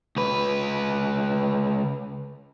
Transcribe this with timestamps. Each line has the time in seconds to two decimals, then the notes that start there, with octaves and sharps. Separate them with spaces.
0.16 C#2 B4